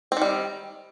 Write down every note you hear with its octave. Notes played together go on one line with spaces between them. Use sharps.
D#3 G3 C4